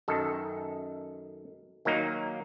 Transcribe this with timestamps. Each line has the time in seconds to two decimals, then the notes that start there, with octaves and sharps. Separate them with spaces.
0.08 F#2 D#3 A4
1.85 D#3 F#3 A#3 D#4